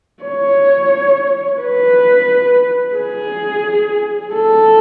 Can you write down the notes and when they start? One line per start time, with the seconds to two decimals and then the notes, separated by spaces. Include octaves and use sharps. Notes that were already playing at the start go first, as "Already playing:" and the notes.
0.23 C#5
1.61 B4
2.97 G#4
4.34 A4